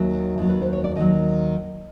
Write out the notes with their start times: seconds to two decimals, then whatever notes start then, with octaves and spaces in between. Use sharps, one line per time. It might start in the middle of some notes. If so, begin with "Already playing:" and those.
Already playing: D#2 D#3 F#3 E5
0.38 D#2 D#3 F#3
0.49 B4
0.62 C5
0.73 C#5
0.84 D5
0.96 D#2 D#3 F#3 D#5